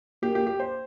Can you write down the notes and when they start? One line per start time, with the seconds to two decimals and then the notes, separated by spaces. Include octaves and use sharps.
0.23 A#3 G4
0.35 G4
0.47 G4
0.60 C5